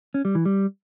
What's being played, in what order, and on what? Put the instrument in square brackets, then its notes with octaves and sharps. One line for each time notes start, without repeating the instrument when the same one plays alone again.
[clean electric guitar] C#4
G3
E3
G3